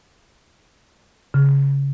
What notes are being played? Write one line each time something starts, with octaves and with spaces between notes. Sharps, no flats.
C#3